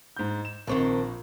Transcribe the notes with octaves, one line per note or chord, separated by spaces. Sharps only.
G#2 G6
E7
A#1 D#3 C4 D4 C#6